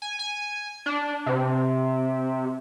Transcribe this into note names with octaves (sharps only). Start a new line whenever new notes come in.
G#5
G#5
D4
C3